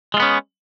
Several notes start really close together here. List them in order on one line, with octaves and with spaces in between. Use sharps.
G#3 F4 B3 C#4